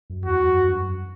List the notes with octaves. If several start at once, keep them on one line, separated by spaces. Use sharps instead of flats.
F#2
E2 F#4
F#2
E2
G2
F#2